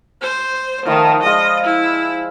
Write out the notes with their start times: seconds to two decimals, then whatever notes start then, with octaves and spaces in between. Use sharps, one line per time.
0.22 C5
0.86 D#3 F3 A3 B5
1.23 G#3 F4 D#5
1.64 E4